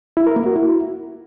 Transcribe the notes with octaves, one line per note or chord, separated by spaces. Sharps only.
E4
A#4
A#3
F#4
E4